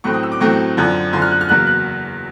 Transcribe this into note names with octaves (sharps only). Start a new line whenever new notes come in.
A2 F#3 A3 C4 C#6
D#6
E6
D6
A2 F#3 A3 C4 C#6
F#2 D3 F3
F#2 D3 F3 C6
F6
F#6
F6
E2 C#3 F#3 A#3 F#6
F#6